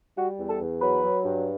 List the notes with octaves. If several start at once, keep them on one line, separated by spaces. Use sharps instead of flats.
G3 F#4
E2
A4
E2
F#3 B4
F#3
G2